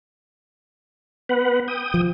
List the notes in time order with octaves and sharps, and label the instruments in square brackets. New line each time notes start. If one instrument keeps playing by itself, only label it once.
[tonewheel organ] B3 B4 F#5
G5 D#6
[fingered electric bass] F3